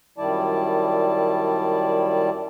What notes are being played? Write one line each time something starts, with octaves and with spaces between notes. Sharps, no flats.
F#2 D#3 G3 E4 D5 A5